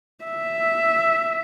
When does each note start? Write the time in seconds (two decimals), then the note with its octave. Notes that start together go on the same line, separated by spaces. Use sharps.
0.24 E5